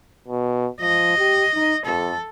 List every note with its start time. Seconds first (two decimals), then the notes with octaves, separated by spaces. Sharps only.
0.28 B2
0.81 F3 D#5
1.18 G4
1.54 D#4
1.86 F2 A4